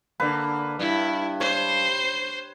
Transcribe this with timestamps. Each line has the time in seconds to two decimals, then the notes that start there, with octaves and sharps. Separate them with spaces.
0.20 D3 A#3 B4
0.80 G2 E4
1.40 C5 C#5